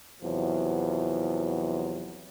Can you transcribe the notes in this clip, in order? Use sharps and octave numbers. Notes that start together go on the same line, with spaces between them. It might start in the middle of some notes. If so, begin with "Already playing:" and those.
E2 C3 F3 F#3